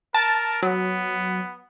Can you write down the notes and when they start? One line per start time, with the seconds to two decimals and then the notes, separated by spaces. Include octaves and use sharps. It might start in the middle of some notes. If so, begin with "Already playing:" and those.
0.15 A#4 A5
0.63 F#3 B3